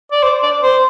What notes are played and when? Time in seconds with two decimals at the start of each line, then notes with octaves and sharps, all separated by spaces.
0.12 D5
0.23 C5
0.43 D5
0.63 C5